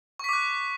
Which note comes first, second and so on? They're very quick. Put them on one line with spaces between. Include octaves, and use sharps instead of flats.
C#6 B6 D6 F#6